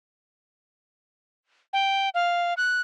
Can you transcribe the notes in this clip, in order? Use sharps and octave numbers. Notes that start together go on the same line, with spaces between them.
G5
F5
F#6